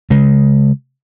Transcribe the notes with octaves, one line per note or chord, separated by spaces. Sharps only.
C#3 G#3